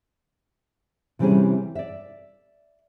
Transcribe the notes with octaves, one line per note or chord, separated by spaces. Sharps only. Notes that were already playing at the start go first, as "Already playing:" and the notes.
C3 E3 G3 C4 C#4 G#4
D5 E5